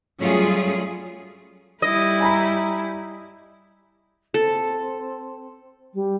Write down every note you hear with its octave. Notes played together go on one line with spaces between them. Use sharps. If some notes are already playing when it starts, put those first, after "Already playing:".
F#3 G3 A3 C#4 F4 G#4
G3 E4 D#5
G#5 A#5 B5
C4 A4
G3